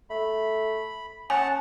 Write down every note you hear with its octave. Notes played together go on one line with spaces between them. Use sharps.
A3 B5
C#4 F#5 G#5 A5